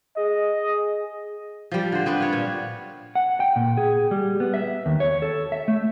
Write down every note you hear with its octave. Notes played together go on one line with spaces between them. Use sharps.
G#4 D#5
F3 G3
D3 C5
B3 C4 D4 B4
F4 C#5
A#2
F#5
G5
A#2
G#4
G3
B3
E5
D#2
C#5
A4
E5
A3